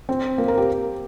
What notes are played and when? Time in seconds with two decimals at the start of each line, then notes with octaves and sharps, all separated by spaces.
0.09 C4
0.38 A#3
0.48 A#4
0.58 G4